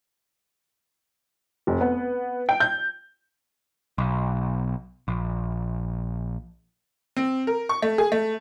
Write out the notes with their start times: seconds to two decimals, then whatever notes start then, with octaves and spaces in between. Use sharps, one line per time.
1.67 F1
1.81 B3
2.49 G5
2.60 G6
3.98 B1
5.08 A#1
7.16 C4
7.47 A#4
7.69 C#6
7.82 A3
7.98 G#4
8.12 A3